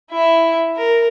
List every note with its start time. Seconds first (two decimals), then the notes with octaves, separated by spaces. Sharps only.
0.11 E4 E5
0.76 A#4